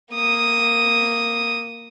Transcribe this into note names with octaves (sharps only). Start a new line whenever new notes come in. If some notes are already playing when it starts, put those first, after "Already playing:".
A#3 D#6